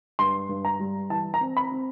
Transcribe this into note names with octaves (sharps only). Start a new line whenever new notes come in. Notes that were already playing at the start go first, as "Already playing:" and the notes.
G2 C6
G2
A#5
G3
E3 A5
A#5
C4
B5
C4